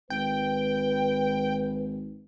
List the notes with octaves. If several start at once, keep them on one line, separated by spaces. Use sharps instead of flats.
G#1 B4 G5